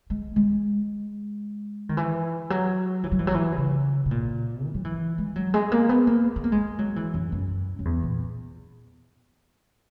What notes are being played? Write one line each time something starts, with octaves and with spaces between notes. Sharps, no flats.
G#3
G#3
D#3
E3
F#3
E3
F#3
E3
F#3
E3
B2
C#3
B2
A#2
E3
F#3
E3
G#3
F#3
G#3
A#3
B3
A#3
B3
A#3
G#3
F#3
E3
F#2
F#2
F#2
E2
A#2